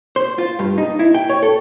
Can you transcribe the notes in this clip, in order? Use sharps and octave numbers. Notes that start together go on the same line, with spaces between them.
C5
F4
G2
D#4
E4
G5
C#5
A4